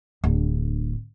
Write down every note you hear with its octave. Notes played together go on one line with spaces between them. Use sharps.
D1 D4